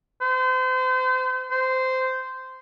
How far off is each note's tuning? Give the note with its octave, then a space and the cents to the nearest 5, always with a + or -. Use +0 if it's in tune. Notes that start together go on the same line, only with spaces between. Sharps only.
C5 -35
C5 -15